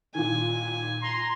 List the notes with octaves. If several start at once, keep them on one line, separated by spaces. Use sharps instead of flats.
A#2 D#3 G#5
A#5 C6